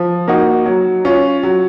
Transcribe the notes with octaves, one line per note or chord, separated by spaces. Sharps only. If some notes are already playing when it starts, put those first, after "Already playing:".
Already playing: F3
A#3 D#4 F#4
F#3
C#4 F4
F#3